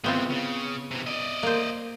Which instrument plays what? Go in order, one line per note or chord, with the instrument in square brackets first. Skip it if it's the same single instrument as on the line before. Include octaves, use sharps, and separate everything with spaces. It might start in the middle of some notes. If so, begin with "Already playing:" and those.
[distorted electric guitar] C#3 E3 [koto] B3 C4 F4
[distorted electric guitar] C#3
C3 E3
D5 D#5
[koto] A#3 C5